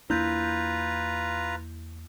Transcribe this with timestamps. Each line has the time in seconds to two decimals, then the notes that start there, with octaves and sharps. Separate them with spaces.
0.10 E2 A#3 D4 E4 F4 B4 A#5 G6